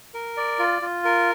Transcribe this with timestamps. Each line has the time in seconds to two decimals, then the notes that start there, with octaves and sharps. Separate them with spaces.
0.14 A#4
0.37 D5
0.59 F4
0.82 F4
1.05 A#4